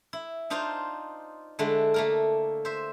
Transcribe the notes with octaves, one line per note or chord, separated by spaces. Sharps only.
E4
D4 D#4 F4 C5 F5
D3 G#3 A3 E4
A3 A#3 A#4
C5 E5